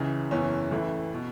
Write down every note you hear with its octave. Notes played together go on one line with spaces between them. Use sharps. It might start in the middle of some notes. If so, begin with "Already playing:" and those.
Already playing: C#2 C#3 E3
F#1 E2 E3 C#4
A1 A2 E3
B2